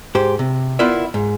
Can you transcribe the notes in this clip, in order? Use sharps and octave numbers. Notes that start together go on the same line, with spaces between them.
G#2 G4 C5
C3
B3 E4 F4 A#4 D5 E5
G#2